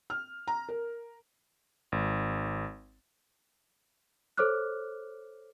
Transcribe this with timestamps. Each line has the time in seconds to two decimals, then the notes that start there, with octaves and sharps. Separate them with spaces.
0.10 F6
0.47 A#5
0.69 A#4
1.92 G#1
4.37 A4 C5 C#5 D6 F6 F#6